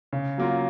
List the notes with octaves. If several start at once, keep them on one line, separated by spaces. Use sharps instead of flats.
C#3
F#3 A#3 F4